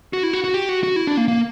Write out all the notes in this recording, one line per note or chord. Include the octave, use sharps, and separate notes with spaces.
F#4
E4
F#4
F#4
G4
F#4
F#4
E4
D4
A#3
A#3